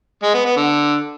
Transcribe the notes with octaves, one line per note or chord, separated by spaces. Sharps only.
G#3
B3
B3
D3